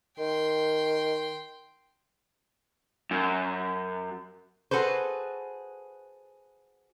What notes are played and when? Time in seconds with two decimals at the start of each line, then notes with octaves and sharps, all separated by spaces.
0.19 D#3 G5 C6
3.11 F#2
4.71 F#4 G#4 A4 B4 C5